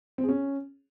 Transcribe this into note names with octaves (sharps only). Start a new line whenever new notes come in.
C4
G#4
C#4